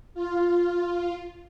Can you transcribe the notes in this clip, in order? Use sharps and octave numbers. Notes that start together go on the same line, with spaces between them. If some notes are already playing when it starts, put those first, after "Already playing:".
F4